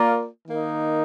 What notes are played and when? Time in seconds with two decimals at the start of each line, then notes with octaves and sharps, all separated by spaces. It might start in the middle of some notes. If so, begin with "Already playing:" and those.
Already playing: A#3 F4 A#4 D5
0.47 D#3 A#3 D#4